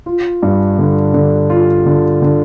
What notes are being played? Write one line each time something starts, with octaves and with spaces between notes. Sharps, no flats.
F4
G2
D3
D3
F4
D3
D3